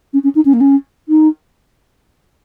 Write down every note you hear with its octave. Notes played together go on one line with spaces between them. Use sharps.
C#4
C#4
D#4
C#4
A#3
C#4
D#4